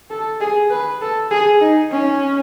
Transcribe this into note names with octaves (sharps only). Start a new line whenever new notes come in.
A4
G#4
B4
A4
G#4
D#4
C#4